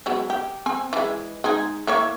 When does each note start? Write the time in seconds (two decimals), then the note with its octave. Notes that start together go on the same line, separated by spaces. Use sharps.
0.06 F#3 G#3 B3
0.30 G4
0.66 C4 G#5
0.93 E3 G#3
1.44 G#3 D#4 G#4
1.87 E3 A#3 C#5